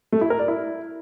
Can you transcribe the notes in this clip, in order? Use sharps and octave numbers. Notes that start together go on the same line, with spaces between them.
A3
E4
A#4
D5
E4